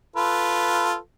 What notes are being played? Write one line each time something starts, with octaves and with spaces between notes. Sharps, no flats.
F4 A4 B4